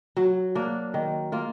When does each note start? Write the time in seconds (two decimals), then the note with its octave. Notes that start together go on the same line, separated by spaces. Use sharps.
0.17 F#3
0.55 A#3 D4 F#4
0.94 D#3
1.32 A#3 F4